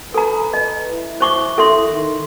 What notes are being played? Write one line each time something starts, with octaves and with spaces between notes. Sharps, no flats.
A4 B4 A#5
D#5
E4
C5 C#6 D6
A4 E5 C6
D#3